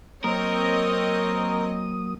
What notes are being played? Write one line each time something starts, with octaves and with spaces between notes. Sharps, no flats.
F#3 A#3 C4 A#4 C#5 D#5 D#6